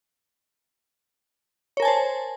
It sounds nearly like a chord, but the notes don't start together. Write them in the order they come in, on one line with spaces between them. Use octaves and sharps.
C#5 A#4 G#5 A5 C5